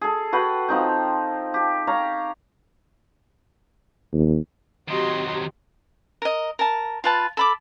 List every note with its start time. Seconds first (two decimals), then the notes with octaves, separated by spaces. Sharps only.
0.01 G#4 A4
0.33 F#4 B4 F#5 G5
0.69 F3 C4 D#4 G5
1.54 G4
1.87 C#5 F5 A#5
4.13 D#2
4.88 D#3 F#3 C4 F#4 G4 D#5 C6
6.22 A#4 D#5
6.59 A#4 A5
7.04 F4 B4 A5
7.37 A4 B5 D6